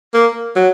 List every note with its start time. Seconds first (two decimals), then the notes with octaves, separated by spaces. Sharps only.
0.14 A#3
0.56 F#3